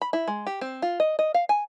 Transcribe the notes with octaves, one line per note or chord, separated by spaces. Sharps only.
B5
E4
G#3
G4
C4
F4
D#5
D#5
F5
G#5